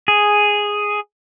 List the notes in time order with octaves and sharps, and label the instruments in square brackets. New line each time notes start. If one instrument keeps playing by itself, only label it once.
[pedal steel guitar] G#4